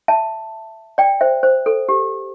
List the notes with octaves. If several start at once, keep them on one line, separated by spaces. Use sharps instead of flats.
E5 A5
D5 G5
C5 E5
C5
A4
G4